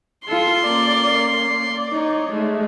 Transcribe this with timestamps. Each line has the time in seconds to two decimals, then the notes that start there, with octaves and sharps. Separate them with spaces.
0.28 F4 A4 C6
0.63 A#3 C#4 D5
1.40 D5
1.92 D#4 C#5
2.31 G#3 A3